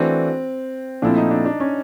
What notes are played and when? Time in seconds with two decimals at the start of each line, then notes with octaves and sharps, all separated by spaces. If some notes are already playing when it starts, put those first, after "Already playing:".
Already playing: E3 A3 C4 D4 F#4
1.02 A#2 F3 A3 C4 D4 E4
1.17 D#4
1.31 D4
1.45 D4
1.60 C#4